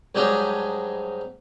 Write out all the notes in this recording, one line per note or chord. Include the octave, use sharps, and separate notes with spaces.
G#2 F#3 G3 D4 D#4 D#5